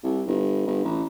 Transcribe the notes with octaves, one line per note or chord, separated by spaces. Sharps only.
C2
G1
G1
A1